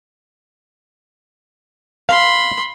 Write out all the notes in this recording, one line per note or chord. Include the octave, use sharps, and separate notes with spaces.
F5 B5 C6